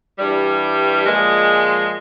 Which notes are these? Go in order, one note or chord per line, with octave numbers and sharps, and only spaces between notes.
G2 E3 G3
A#2 F3 G#3